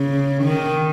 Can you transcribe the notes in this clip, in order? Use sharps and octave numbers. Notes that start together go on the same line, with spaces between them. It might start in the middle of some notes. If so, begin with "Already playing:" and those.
Already playing: C#3
D#3